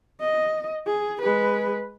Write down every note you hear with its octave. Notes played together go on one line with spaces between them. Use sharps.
D#5
G#4
G#3 B4